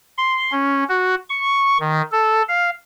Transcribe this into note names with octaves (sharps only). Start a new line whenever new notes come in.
C6
C#4
F#4
C#6
D#3
A4
F5